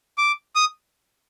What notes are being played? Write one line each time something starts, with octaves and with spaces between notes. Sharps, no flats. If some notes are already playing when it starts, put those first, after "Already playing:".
D6
D#6